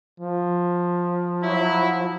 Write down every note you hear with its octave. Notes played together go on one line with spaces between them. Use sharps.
F3
F#3 E4